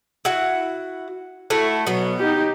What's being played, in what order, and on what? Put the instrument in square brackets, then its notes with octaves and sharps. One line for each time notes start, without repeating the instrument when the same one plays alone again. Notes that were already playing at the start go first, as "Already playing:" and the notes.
[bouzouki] E4 F#4 F#5
A3 E4 F#4
[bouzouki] B2 B3 [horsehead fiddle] F#3
[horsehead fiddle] D#4 G4